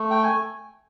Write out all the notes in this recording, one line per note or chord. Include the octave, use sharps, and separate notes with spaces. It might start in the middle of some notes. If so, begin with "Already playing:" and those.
Already playing: A3
G5
G#5